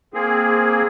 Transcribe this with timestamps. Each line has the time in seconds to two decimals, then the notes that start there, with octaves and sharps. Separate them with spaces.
0.14 A#3 C4 G#4